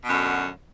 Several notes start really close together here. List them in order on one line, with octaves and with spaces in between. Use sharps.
B2 F#2 D3